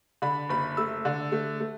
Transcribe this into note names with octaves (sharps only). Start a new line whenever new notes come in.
D3 B5
F#1 B5
A3 E6
D3
A3
A3